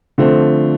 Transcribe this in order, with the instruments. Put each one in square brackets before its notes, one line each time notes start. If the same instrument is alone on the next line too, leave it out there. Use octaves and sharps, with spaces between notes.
[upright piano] D3 F3 A3 C4